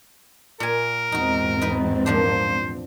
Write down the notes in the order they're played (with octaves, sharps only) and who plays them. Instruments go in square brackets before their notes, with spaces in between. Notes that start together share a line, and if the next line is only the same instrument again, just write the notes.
[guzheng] A#2 G#5 [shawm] A#4
[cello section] E2 G#2 C4 [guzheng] D#4 F#4
[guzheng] D#4 B4
[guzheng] A#2 F3 D4 [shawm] C5